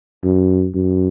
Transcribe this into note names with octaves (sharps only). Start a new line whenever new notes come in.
F#2
F#2